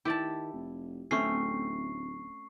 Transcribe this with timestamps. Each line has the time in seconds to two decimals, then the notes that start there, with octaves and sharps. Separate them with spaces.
0.05 D#3 E4 G4 D5 A5
0.53 F1
1.11 D1 A3 C4 C#4 C#6 C7